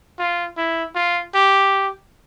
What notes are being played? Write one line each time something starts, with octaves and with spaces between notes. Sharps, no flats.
F4
E4
F4
G4